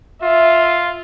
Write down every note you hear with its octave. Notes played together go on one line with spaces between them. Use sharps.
F4 E5